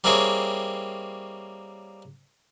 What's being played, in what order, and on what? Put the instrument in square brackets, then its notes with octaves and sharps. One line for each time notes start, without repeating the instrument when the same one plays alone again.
[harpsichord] G3 A#3 C4 E4 G#4 C#5